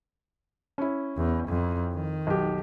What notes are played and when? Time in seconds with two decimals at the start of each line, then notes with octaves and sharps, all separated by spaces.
0.78 C#4 E4
1.17 E2
1.48 F2
1.93 D#3
2.27 B1 G4